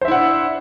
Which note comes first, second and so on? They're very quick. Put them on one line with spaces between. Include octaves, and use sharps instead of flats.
C5 E5 E4 F#5 D4